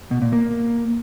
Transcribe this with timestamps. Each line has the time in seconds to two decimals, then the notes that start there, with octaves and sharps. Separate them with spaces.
0.11 B2
0.22 A#2
0.32 A#3